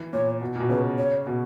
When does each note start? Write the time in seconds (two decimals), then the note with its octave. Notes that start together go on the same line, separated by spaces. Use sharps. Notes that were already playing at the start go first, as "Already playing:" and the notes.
Already playing: E3
0.13 A#2 C#5
0.41 B2
0.56 A#2
0.60 B2
0.69 C#3 B4
0.98 C#5
1.27 B2